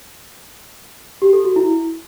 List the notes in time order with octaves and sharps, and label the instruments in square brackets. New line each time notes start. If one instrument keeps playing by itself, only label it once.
[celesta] G4
A4
F#4
E4